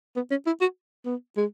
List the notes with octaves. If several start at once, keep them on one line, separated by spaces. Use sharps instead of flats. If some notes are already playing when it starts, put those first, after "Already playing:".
B3
C#4
E4
F#4
B3
G#3